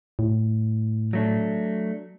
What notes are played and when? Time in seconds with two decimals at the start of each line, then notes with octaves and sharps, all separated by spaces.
0.19 A2
1.13 F#3 A3 D4